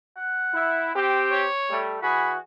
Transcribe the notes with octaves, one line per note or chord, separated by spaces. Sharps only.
F#5
E4
C4 G4
C#5
G3 A3
E3 F#4 G#4 B5